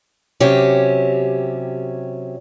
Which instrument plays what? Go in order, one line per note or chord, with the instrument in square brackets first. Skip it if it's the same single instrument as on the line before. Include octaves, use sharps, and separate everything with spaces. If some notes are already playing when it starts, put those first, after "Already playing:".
[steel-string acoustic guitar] C3 F#3 C#4 G4